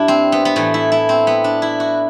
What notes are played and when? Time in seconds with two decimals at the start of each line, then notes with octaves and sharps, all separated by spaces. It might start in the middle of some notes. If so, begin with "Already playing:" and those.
Already playing: G2 D4 E4
0.08 C4
0.32 B3
0.45 B3
0.56 A2 E3 A3
0.74 E4
0.92 E4
1.09 C4
1.27 B3
1.44 D4
1.62 E4
1.80 F#4